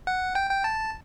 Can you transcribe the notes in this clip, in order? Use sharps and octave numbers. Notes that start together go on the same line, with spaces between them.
F#5
G5
G5
A5